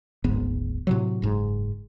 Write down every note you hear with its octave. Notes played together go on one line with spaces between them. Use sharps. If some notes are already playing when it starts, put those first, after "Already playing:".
D1 G#1 G#2 B3
A2 C3 F#3
F#1 G#2